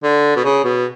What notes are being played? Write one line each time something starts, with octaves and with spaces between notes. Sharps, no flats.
D3
B2
C#3
B2